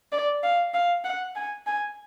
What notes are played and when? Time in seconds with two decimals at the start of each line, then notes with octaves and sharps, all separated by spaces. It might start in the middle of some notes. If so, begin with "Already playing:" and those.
0.12 D5
0.43 F5
0.74 F5
1.04 F#5
1.36 G#5
1.67 G#5